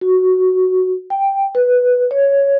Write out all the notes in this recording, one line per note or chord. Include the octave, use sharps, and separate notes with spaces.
F#4
G5
B4
C#5